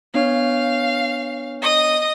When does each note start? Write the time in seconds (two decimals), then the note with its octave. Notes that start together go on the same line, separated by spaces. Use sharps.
0.14 B3 D4 C#5 F5
1.62 D#5 D#6